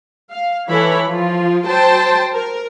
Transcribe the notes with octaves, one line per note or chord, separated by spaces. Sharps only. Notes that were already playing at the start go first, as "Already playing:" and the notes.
F5
E3 E4 A4 C#5 B5
F3 F4
F#3 C5 G5 A5
A#4